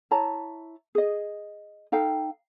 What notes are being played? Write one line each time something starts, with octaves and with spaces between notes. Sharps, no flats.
E4 C#5 A5 A#5
G#4 D#5
D#4 A4 F5 G5